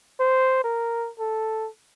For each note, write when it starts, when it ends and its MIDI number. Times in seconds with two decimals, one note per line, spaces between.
0.20 0.64 72
0.64 1.10 70
1.19 1.69 69